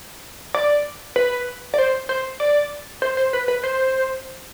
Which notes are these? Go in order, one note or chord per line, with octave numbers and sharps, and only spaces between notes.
D5
B4
D5
C5
C5
D5
C5
C5
B4
B4
C5